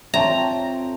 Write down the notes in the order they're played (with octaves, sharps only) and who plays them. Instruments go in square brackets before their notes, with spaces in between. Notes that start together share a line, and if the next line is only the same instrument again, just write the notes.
[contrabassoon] F2 [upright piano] C#5 G5 A5 [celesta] E5 C6 [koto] A#5